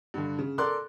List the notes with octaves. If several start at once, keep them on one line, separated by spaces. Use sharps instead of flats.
G2 D3
C#3
A4 A#4 D5 C6 D6 F#6